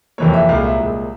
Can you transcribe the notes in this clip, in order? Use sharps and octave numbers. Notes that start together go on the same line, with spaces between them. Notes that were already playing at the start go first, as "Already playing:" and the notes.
F2 C3 E3 A#3 C#5
E5
C2 A#2 G#3 F5
E5
C2 A#2 G#3